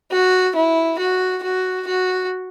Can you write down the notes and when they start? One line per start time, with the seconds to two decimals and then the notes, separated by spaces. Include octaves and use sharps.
0.11 F#4
0.56 E4
0.99 F#4
1.44 F#4
1.87 F#4